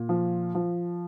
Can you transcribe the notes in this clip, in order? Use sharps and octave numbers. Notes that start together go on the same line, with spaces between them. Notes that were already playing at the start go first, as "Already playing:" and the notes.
Already playing: A#2
F3
F3